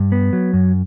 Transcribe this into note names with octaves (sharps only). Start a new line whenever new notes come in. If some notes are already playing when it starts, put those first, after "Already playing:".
Already playing: G2
B3
F#3
F#2